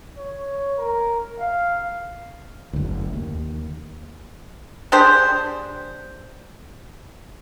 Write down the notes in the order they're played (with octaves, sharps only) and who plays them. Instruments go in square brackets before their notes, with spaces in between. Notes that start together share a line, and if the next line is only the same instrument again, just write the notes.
[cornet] C#5
A#4
F5
[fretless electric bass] F#1 D2
D#2
[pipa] D4 G4 G#4 C5